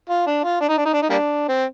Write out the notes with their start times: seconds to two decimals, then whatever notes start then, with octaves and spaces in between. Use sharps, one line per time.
0.09 F4
0.27 D4
0.44 F4
0.61 D4
0.69 D#4
0.77 D4
0.85 D#4
0.93 D4
1.02 D#4
1.10 G3 A#3 D4
1.49 C4